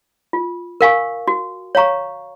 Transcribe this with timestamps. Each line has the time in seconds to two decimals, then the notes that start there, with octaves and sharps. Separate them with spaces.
0.33 F4
0.81 A#4 F5 G#5 C#6
1.28 F#4
1.75 C#5 F5 A#5 C#6